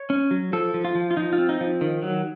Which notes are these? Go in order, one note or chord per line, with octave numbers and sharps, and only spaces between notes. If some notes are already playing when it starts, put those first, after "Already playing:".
Already playing: C#5
C#4
F#3
F3 A4
F3
F4
F3
F4
F3 D#4
F4
C4
D#4
F3
D#3
F#3